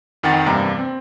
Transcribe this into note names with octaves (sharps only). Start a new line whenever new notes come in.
F2 D#3 F#5 G5 A6
E2 G2 C3 A#3 A#5
C4